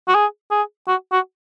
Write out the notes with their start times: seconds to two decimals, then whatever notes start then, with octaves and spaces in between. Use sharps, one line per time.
0.08 F#4
0.15 G#4
0.51 G#4
0.87 F#4
1.12 F#4